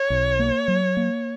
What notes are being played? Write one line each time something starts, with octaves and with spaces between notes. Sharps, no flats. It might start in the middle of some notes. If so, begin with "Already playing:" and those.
Already playing: C#5
B1
A#3
F#3
A#3